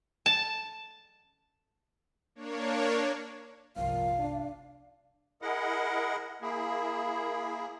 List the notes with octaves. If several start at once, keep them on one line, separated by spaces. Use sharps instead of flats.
A5
A#3 D4 C#5
G1 C2 A#2 F3 F5
D4
E4 G#4 A#4 D#5 F#5
A#3 E4 G#4